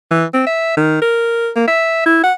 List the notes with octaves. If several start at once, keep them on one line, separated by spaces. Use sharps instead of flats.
E3
C4
E5
D#3
A#4
A#3
E5
E4
F#5